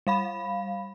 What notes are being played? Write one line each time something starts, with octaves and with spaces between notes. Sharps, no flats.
G3 F5 B5